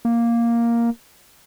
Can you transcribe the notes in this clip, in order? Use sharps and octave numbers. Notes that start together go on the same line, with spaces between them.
A#3